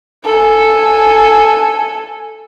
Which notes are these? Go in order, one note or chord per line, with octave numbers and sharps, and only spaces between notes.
A4 G#5